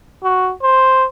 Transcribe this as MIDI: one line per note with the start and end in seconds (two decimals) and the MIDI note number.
0.24 0.51 66
0.63 1.05 72